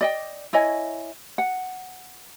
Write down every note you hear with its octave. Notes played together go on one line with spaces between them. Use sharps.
D5 D#5 G5
E4 C#5 D#5 G#5
F#5